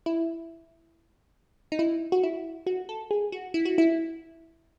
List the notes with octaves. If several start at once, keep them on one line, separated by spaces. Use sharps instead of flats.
E4
D#4
E4
F#4
E4
F#4
A4
G#4
F#4
E4
F#4
E4